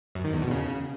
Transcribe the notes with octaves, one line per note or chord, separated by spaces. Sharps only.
F#2
D#3
E2
B2
C#3